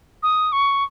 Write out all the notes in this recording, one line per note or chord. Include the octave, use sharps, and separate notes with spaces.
D#6
C#6